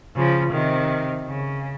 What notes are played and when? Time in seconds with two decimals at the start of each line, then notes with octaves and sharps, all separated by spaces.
0.14 C#3 F3
0.52 C3 D#3
1.26 C#3